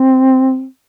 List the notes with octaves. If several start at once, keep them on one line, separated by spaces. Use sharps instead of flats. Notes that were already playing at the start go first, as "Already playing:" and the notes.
Already playing: C4